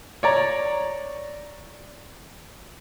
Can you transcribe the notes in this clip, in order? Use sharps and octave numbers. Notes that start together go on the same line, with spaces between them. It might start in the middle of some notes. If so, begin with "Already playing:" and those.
C#5 D5 A#5